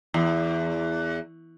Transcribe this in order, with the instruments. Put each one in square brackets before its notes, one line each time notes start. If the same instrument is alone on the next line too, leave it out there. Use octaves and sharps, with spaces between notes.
[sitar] E2